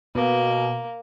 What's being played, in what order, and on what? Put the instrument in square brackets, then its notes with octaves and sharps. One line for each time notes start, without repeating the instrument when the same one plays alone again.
[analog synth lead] B2 [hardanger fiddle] A#3